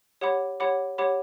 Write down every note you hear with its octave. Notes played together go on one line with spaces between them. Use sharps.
G4 C#5 F#5 B5 D6
G4 C#5 F#5 B5 D6
G4 C#5 F#5 B5 D6